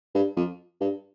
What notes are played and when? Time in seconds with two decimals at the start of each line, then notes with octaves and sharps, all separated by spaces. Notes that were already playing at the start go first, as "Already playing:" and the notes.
0.14 G2
0.36 F2
0.81 G2